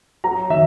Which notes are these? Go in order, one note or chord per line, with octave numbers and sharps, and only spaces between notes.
F#3 A#5
D#3 E5